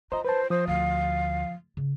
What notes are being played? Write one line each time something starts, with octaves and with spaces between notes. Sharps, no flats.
F4 C5 D#5 A#5
B4 C5 A5
F3 C5 D#6
D2 F5
C#3